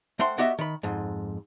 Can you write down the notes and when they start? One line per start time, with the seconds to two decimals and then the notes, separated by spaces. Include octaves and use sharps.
0.19 A3 C5 F#5 G5 C6
0.38 B3 F#4 G4 D#5 E5
0.59 D#3 B5
0.83 F2 G#2